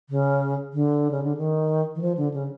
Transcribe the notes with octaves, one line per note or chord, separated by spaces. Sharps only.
C#3
D3
C#3
D3
D#3
E3
F3
D3
C#3